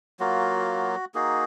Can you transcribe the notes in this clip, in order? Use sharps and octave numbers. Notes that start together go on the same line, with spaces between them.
F#3 A#3 F4 F#4
A#3 D#4 F#4 G#4